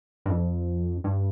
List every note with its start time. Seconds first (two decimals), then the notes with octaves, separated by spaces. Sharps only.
0.26 G2
0.30 F2
1.04 G2